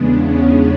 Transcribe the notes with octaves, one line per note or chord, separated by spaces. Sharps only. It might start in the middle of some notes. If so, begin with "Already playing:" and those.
Already playing: E2 C#3 G#3 B3 D4
C#4